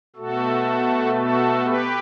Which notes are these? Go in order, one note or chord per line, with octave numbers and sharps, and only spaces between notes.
B2 A3 F#4 A4
F#4 A4
G4 B4